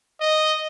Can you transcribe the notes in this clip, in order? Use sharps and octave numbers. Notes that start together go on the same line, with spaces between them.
D#5